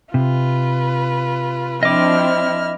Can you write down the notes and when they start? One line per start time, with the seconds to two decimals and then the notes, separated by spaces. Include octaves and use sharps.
0.14 C3 F4 B4
1.83 F3 C4 D4 E4 D#5 D6 F6